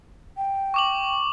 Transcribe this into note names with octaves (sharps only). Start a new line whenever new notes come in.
G5
C#6 D6 F#7